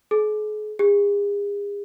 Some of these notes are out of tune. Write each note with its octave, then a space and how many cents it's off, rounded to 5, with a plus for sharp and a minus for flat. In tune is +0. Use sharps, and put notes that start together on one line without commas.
G#4 +40
G#4 -40